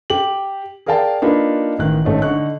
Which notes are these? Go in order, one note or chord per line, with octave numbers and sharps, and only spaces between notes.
G4 F#7
G#4 A#4 D5 F5 G5 A5
A#3 D4 D#4 F4 B4
A1 D#3 F#6
G#1 A3 C#4 D#4
D3 D#4 C#6 F#6